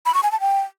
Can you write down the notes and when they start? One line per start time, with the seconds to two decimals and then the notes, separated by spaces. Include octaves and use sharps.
0.06 B5
0.14 C#6
0.23 G#5
0.32 A5
0.40 G5